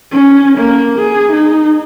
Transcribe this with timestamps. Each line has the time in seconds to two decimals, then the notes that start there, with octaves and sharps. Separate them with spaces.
0.11 C#4
0.58 A#3
0.99 G#4
1.32 D#4